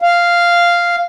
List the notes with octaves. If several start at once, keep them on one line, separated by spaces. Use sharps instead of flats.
F5